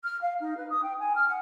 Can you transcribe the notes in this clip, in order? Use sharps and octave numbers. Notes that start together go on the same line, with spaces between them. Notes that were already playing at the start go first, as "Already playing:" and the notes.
F6
F5
D#4
B4
D#6
G5
G#5
F6
F#5